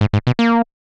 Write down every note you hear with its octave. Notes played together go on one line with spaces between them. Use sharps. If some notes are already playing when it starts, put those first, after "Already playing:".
G#2
G#2
B2
A#3